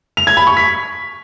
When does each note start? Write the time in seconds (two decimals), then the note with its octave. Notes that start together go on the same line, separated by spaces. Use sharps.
0.17 F7
0.27 G#6
0.37 B5
0.47 C#6
0.57 B6